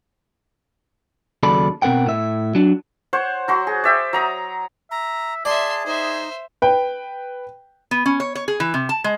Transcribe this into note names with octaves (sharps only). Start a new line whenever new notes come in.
D#2 C#3 F#3 A4 D5 B5
B2 C4 A#4 F#5 G5
A2 E5
F#3 D4
C5 C#5 F#5
F#3 F#4 C6
G#4
D5 E5 G5
F#3 A#5 D#6
E5 A#5
G#4 D5 E5 A5 C6
D#4 C5 E5
B4 G5
B3
C#4
C#5
C#5
G#4
E3
C3
A5
G#3